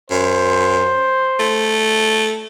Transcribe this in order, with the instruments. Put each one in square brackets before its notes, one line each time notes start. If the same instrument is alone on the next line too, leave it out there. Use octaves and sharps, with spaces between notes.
[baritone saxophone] F#2 [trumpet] C5
[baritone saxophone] A3